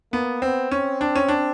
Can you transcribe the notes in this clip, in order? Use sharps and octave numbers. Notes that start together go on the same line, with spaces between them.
A#3 B3
B3 C4
C4 C#4
D4
C#4
D4